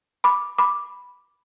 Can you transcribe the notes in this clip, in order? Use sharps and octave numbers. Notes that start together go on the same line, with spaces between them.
B5 D6
B5 D6